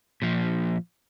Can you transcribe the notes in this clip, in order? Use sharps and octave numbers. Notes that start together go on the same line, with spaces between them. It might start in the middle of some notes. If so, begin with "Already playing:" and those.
A#2 F3